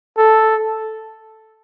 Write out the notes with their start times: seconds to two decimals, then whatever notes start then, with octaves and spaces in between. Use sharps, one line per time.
0.17 A4